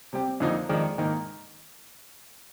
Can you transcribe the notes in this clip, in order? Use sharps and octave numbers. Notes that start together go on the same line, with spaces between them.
C3 G3 C4 G4
F2 D3 F3 A#3 D#4
F2 D#3 G#3 D4
G#2 D#3 A#3 D#4